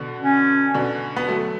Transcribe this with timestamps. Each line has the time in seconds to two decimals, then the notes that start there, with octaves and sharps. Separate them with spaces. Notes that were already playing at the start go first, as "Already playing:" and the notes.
Already playing: B2 D3
0.21 C#4
0.74 B2 D3
1.16 B3
1.28 F#3 A3